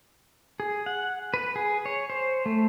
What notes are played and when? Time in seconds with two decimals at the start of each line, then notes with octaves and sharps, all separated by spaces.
0.60 G#4
0.86 F#5
1.34 B4
1.56 G#4
1.86 C#5
2.10 C5
2.46 A3